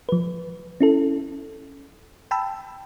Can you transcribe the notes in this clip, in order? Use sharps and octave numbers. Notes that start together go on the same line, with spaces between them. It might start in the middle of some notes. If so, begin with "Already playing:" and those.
F3 B4
C#4 E4 A4
G5 A5 B5 E6